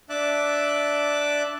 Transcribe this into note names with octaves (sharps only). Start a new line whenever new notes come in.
D4 E5 A5 D6 F#6